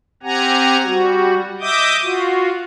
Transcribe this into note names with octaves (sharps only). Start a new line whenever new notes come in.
C4 G4 F#5 G#5 A#5
G3 F#4
D#5 E5 D6 D#6 G6
F4 F#4